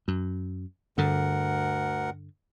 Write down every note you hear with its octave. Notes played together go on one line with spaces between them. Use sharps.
F#2
D2 G2 D3 A#4 F#5